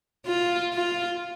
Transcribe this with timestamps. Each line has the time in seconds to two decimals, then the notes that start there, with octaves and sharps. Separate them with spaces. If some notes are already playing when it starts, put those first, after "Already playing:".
0.26 F4
0.73 F4